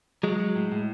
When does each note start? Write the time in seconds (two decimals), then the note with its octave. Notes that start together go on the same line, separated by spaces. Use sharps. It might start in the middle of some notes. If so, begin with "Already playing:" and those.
0.23 F#3 G#3
0.40 F#3
0.56 A2
0.72 A2